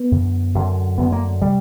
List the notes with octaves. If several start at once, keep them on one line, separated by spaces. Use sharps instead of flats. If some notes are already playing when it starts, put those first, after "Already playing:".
Already playing: B3
F#2 D3
F#2 D3
F#2 D3 B3
A#3
C3 G3